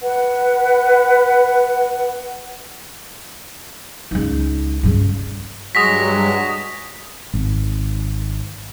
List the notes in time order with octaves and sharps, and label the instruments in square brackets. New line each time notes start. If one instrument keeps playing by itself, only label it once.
[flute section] B4 F#5
[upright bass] C#2 D#4
G2 C#3
[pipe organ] G2 F#3 [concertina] G#3 F#4 [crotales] D#6 A#6 B6
[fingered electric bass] G#1